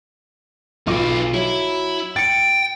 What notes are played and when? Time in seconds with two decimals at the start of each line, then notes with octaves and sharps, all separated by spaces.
0.87 B1 D#4 F4 B4 D6
1.34 F#3 E4
2.16 G5 A6 C#7